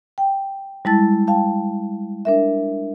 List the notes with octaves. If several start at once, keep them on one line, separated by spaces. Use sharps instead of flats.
G5
G3 G#3 E4 A5 A6
F5 G5 A5
D4 A#4 E5